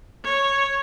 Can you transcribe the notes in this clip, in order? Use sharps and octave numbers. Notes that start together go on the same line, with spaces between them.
C#5